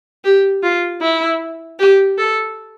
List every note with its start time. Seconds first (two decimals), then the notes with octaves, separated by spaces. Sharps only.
0.24 G4
0.63 F4
1.01 E4
1.79 G4
2.18 A4